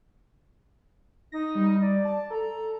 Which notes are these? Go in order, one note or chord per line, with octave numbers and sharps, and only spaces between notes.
D#4 A#6
G3
D5
A5
A4 A#5